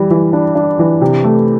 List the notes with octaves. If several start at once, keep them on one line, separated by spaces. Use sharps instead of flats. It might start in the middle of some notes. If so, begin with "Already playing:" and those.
Already playing: E3 G3
E3
D4
D4
E3
C3
A3